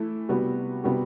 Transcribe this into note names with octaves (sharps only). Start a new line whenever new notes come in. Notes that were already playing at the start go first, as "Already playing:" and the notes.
Already playing: E3 A3 E4
C3 G3 B3 F#4
C3 G3 B3 F#4